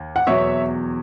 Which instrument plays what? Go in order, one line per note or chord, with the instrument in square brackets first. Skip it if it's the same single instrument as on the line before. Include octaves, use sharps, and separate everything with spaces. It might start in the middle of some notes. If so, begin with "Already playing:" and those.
Already playing: [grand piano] D#2
[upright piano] F#5
[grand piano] E2 B2 F#3 [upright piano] C#5 E5